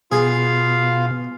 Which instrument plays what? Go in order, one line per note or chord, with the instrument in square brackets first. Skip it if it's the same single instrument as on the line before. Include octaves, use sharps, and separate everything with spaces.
[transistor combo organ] B2 [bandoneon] F4 F5 [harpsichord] G#4